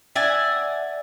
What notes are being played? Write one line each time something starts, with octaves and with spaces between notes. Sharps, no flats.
D5 E5 F#5 G#5